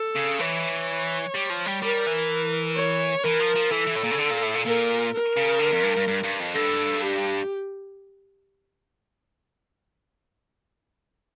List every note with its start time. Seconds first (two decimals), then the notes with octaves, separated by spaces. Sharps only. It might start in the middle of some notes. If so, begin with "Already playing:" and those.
Already playing: A4
0.16 C#3
0.39 E3 C#5
1.35 G3
1.50 F3
1.66 G3
1.82 G3 A#4
2.06 E3
2.76 C#5
3.24 E3 A#4
3.40 F3
3.55 F3
3.71 E3 A4
3.87 E3
3.96 A2
4.04 A#2
4.11 C#3
4.18 D3
4.30 A#2
4.42 A2
4.54 A#2
4.65 A#2 A#4
5.13 A#4
5.37 C#3
5.60 D3
5.72 F2
5.84 G2
5.96 G2
6.08 G2
6.23 G2
6.40 F2
6.55 G2 A4
7.02 G4